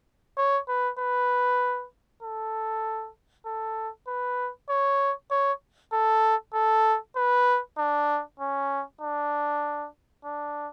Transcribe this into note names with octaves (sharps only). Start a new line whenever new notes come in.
C#5
B4
B4
A4
A4
B4
C#5
C#5
A4
A4
B4
D4
C#4
D4
D4